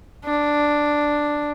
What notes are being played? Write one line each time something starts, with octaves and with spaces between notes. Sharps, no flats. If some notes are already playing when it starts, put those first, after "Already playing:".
D4